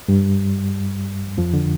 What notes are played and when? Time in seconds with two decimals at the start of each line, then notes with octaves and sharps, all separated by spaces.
0.08 G2 G3
1.38 F2 F3
1.54 D3